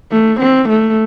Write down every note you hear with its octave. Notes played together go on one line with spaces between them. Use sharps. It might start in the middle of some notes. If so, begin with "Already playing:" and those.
A3
C4
A3